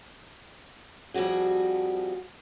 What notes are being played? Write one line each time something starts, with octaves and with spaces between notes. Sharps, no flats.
F2 F3 G3 F#4 G#4